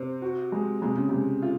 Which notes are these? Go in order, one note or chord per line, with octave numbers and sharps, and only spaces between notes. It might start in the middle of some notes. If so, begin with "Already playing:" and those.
Already playing: C3 C5
F#4
G#3
C3 G#3
C#3
C3 G#3
F4